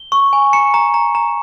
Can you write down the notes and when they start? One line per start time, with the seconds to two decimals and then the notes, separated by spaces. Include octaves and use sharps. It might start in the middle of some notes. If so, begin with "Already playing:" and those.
Already playing: G7
0.12 C#6
0.33 G#5
0.53 A#5 C#7
0.74 A#5
0.94 A#5
1.15 A#5